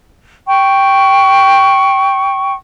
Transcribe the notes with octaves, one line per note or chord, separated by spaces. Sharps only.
G5 C#6